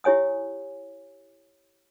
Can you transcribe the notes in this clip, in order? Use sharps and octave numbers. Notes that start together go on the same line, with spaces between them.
E4 G4 C#5 G#5 D#6